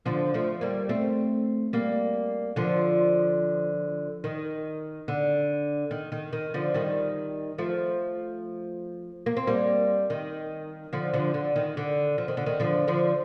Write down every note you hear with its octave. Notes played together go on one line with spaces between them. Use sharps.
D3 F3
F3 A3
G3 A#3
A3 C4
G3 A#3
D3 F3
D#3
D3
D#3
D#3
D#3
D3 F3
D#3 G3
F3 A3
A#3
C4
G3 A#3
D#3
D3 F3
D3 F3
D3
D#3
D3
F3
D#3
D3
D#3
D3 F3
D3 F3